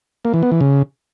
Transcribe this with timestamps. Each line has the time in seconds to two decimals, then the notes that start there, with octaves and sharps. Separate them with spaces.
0.25 A#3
0.34 E3
0.43 B3
0.52 E3
0.61 C#3